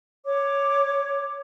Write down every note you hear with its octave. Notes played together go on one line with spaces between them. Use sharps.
C#5 D6